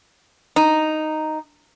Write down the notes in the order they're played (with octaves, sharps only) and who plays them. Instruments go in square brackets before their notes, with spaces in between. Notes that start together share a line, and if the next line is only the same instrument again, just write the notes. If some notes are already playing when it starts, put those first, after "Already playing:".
[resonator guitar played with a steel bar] D#4